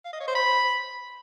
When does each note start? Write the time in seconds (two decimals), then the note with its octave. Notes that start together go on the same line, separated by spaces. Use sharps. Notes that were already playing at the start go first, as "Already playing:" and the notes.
0.05 F5
0.13 D#5
0.20 C#5
0.28 C5
0.35 B5